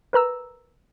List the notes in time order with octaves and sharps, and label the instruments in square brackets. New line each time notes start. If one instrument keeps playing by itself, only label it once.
[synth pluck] A#4 B4 A#5 E6